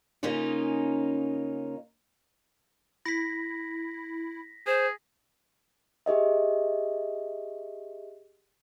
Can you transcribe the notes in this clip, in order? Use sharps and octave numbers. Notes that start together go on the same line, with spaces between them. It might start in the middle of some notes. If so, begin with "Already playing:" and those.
C#3 A#3 C#4 D#4 F4
E4 A#6 B6
G#4 C5
G4 G#4 D#5 E5